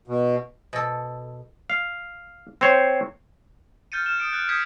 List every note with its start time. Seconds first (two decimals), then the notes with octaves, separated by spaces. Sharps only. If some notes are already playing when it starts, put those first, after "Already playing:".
0.07 B2
0.73 B2 A4
1.70 F5
2.61 C4 C5 C#5
3.92 F6 G6 A6 C#7 D#7
4.06 F6 E7
4.20 D#6 D7
4.33 F#6 A6
4.49 D#6 G6 G#6 B6 C#7